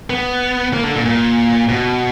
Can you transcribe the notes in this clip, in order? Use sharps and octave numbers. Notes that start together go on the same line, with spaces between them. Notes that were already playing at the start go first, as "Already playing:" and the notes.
B3
A#3
D3
A#2
A#2
B2